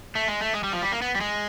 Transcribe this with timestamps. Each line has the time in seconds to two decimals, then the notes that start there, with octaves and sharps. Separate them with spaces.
0.15 A3
0.28 G#3
0.41 A3
0.54 G#3
0.64 G3
0.73 F3
0.82 G3
0.92 A#3
1.02 B3
1.16 G3
1.21 G#3